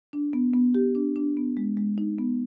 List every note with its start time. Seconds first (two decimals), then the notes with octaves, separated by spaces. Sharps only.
0.13 D4
0.33 B3
0.54 B3
0.75 G4
0.95 D4
1.16 D4
1.37 B3
1.57 G#3
1.77 G#3
1.98 D#4
2.18 B3